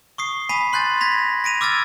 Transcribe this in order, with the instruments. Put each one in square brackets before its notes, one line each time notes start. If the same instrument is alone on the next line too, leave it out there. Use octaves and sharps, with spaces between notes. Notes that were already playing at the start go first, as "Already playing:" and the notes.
[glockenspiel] C#6 D#6 C7
G#5 B5 B6 C7 D#7
C6 F#6 G6 A6
G#6 A#6 B6 F7
A#6 D7 D#7 F7
D6 E6 F6 G#6 A6